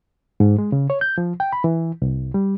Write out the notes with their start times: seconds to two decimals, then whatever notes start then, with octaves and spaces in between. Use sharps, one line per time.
0.40 G#2
0.58 G#3
0.72 C#3
0.90 C#5
1.01 G6
1.18 F3
1.40 G5
1.53 B5
1.64 E3
2.02 C2
2.34 G3